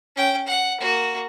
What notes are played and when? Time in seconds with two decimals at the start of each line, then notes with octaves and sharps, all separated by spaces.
0.16 C#4 G5
0.47 F#5
0.81 A#3 F#4